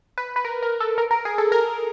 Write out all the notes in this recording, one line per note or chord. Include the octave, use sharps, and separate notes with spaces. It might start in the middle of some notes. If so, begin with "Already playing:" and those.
B4
B4
A#4
A#4
A4
A#4
A#4
G#4
A4
A#4